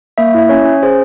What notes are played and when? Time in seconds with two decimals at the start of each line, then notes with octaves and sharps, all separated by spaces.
0.18 A#3 E5
0.34 E4 E5
0.49 C#4 C#5
0.65 C#4
0.83 G#4 C5